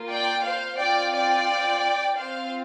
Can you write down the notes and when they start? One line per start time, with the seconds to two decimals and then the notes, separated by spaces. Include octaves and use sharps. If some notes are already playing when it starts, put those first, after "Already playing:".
Already playing: A#3 F4
0.10 D5 G5
0.45 C5 F5
0.79 C4 F4 D5 G5
1.13 D5 G5
2.17 C4 F4 C5 F5